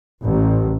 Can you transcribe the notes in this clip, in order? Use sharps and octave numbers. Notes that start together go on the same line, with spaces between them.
A1